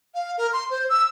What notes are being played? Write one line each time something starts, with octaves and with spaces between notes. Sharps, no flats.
F5
A#4
C6
C5
E6